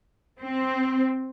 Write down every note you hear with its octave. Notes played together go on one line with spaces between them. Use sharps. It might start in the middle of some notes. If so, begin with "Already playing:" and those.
C4